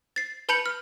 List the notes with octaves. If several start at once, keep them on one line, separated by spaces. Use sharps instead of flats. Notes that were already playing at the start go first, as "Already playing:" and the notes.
A6 C7
B4 A5 B5 G6 C#7 F#7
F6